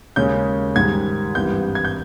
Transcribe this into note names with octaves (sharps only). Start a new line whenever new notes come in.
D#2 C#3 G#3 C#4 G6
G#2 D#3 G3 G#6
G#1 G2 E3 G3 B3 G6
G#6
G6